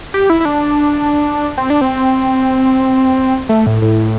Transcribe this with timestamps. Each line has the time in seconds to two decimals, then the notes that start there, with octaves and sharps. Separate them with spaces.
0.14 G4
0.30 E4
0.40 E4
0.45 D4
1.58 C4
1.70 D4
1.81 C4
3.49 A3
3.66 A2
3.82 A2